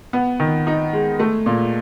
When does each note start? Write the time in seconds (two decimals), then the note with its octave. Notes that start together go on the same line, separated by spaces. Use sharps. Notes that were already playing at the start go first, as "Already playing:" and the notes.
0.13 B3
0.40 D#3
0.67 D#4
0.93 G#3
1.19 A3
1.46 A#2